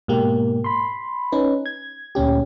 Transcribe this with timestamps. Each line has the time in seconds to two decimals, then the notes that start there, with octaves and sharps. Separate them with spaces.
0.08 G#2 B2 A#3 G4
0.64 B5 C6
1.32 C#4 D#4 B4
1.66 G#6
2.15 D2 A#2 C#4 G4